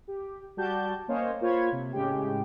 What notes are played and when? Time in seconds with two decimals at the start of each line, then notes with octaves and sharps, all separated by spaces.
0.08 G4
0.57 G3 F#4 G4 A5 G6
1.08 A#3 C#4 C5 C#5 D#5 F5
1.41 A#3 F4 C5 C#5 B5 G#6
1.72 C3
1.93 A2 C#3 G#3 G4 G5